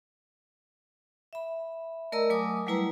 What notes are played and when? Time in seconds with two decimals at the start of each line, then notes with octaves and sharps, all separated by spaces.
1.33 E5 B5
2.12 A3 A#4 D5 D#5 A#5 E6
2.30 F#3 A3 G#5 D6 D#6
2.67 F#3 G3 A3 E4 B4 A#5